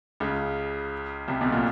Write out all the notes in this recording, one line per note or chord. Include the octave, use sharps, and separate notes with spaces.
C#2 C#3
C2 C3
B1 B2
A#2